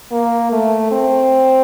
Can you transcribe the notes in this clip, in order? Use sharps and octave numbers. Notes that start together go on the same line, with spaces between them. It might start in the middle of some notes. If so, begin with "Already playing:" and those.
A#3
A3
C4